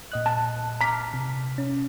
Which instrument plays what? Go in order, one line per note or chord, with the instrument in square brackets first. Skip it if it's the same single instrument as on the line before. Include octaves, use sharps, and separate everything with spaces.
[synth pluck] A#2 D#5 F#6
[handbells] A5
[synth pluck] A5 D6 F6 [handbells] A#5 B6
[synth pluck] C3
C#4